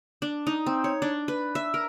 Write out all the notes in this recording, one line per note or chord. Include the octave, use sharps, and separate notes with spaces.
D4
D#4
C4
C#5
D4
B4
E5
A#4